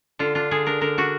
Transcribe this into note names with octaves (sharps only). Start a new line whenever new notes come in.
D3 F4
D4 F4
D3 G#4
D4 A#4
D3 A#4
D4 F#4